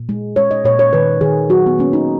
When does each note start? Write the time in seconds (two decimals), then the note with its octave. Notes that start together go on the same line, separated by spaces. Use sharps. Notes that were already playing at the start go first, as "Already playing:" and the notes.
Already playing: A#2
0.09 G#3
0.36 G#3 C#5
0.51 D#5
0.64 A#2 C#5
0.79 C#5
0.93 D#3 B4
1.21 D#3 G#4
1.49 F#3 F#4
1.66 B3
1.79 A#3 C#4
1.93 D#4